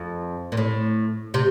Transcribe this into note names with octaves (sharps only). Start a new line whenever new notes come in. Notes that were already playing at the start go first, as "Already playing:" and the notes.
Already playing: F2
A#2
A2
C3